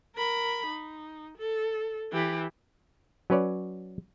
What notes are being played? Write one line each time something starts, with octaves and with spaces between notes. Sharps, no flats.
A#4 B5
D#4
A4
E3 G4
F#3 C#4 B4 C#5 D5